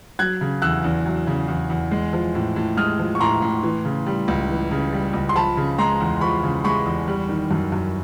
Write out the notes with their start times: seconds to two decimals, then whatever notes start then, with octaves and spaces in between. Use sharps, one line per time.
0.19 F#3 F#6 G#6
0.41 C#3
0.62 E2 E6 F#6
0.84 E2
1.06 F#3
1.27 C#3
1.48 E2
1.70 E2
1.91 G#3
2.13 F3
2.35 A2
2.56 A2
2.77 G#3 D#6 F6
2.99 F3
3.15 C#6
3.20 A2 A#5 C6
3.42 A2
3.63 E3
3.85 C#3
4.06 G3
4.28 C#2
4.49 E3
4.71 C#3
4.93 G3
5.14 C#2
5.29 C6
5.35 F3 A5 B5
5.57 C#3
5.78 G#3 A#5 C6
6.00 E2
6.21 F3 B5 C#6
6.43 C#3
6.64 G#3 B5 C#6
6.86 E2
7.08 G3
7.29 D#3
7.51 F#2
7.72 F#2